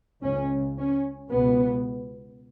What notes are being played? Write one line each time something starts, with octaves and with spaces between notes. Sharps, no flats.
C#2 C#3 C#4
C#4
C#2 B2 B3